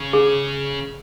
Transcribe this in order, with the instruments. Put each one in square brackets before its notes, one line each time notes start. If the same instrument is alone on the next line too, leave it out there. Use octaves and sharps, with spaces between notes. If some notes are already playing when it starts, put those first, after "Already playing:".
Already playing: [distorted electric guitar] C#3
[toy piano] G#4